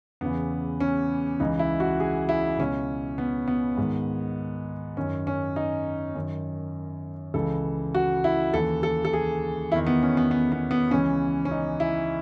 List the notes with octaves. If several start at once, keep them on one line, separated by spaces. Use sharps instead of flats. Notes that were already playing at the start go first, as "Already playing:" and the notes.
E2 C#3 E3 B3
C#4
C#2 C#3 E3 D#4
E4
F#4
G#4
E4
C#2 B2 C#4
B3
B3
G#2 D#3
F#2 D#3 C#4
C#4
D#4
F#2 D#3
C#2 C#3 E3 A4
F#4
E4
D#2 C#3 E3 A4
A4
A4
G#4
E2 D#3 E4
B3
C#4
B3
B3
B3
B3
C#2 C#3 E3 C#4
C#4
D#4
E4